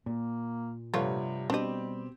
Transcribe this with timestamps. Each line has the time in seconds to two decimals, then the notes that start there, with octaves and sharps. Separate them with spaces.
0.06 A#2 A#3
0.94 G2 C3 F3 A3 B3 F4 C#5
1.50 B2 G3 C4 D4 G4 D#5